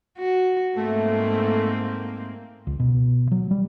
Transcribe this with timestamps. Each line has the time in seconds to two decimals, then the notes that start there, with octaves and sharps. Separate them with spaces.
0.19 F#4
0.77 G#2 A3 A#3 C4
2.67 C#2
2.80 B2
3.31 F#3
3.51 G3